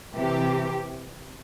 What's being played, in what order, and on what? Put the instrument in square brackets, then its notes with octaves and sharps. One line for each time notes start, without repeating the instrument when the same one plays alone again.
[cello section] C3 E3 G4